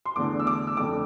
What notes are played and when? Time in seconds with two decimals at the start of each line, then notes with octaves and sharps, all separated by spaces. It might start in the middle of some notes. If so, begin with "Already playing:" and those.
0.06 C6
0.16 E2 D3 A3 D6
0.40 E6
0.47 D6
0.67 E6
0.77 F2 D3 A3 D6